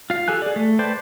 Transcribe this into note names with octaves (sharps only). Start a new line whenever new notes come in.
F4 F5
G4 A4 G#5 F#6
G#4 D5
A3
B4 C5 D5 G5 A5